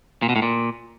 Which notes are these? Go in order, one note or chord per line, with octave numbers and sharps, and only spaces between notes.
A#2
B2
A2
A#2